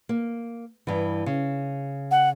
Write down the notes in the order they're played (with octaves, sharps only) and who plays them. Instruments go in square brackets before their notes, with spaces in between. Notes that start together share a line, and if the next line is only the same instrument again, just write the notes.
[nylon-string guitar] A#3
G2 E3
C#3
[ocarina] F#5